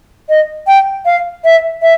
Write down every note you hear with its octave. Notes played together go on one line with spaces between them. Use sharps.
D#5
G5
F5
E5
E5